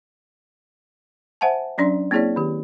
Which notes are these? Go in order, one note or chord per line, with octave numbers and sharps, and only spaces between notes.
C5 E5 F#5 G#5 A5
F#3 C#4 D4 D5 C6
A#3 C4 E4 G#4 C#5 D5
D#3 G4